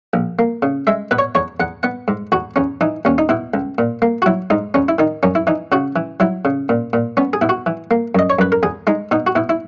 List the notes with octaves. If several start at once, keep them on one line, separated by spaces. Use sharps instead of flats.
A#1
A#3
C#3
G#3 E5
B2 B4
C#5
E2 C#5
E2 F#5
B3 F#5
G#2
E2 F#4
E2 C#4
E3 D#4
D#2 C#4
D#4
B2 E4
C#2
A#2
A#3
F#4
F#3 E4
G#2 D#4
E2 C#4
E4
D#3 D#4
F#2 C#4
E4
E3 D#4
C#3 F#4
E3
F#3 E4
C#3
A#2
A#2
B3 C#4
G#4
B2 E4
F#4
E3
A#3
F#2 D#5
C#5
F#2 B4
A#4
E2 G#4
G#3 D#4
B2 D#4
F#4
B2 E4
E4